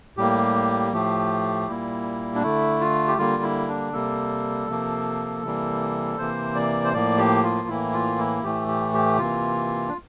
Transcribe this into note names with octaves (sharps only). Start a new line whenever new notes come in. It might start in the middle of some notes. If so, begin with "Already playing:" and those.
A2 G3 A#3 G4
A2 F3 A3 G4
A#2 G3 A#3 E4
D4
D3 A3 E4
F4
G4
D3 G3 A#3 F4
E4
D4
C3 G3 A#3 A4
C3 F3 A#3
C3 E3 G3 A#3
C3 E3 A#3 C5
D5
C5
A2 F3 A#3 D5
G4
F4
A2 E3 A#3 E4
F4
E4
A2 E3 A3 G4
G4
G4
C3 E3 A#3 F4
D4